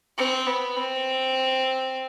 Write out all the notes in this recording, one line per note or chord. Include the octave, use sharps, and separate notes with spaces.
C4
B3
C4